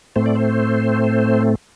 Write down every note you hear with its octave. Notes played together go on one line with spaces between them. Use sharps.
A2 A3 C4 C5
D5
C5